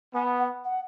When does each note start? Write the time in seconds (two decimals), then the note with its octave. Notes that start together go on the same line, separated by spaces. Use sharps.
0.14 B3 G#5
0.39 F#5
0.64 F#5